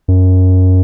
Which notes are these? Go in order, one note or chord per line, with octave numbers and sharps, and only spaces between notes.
F#2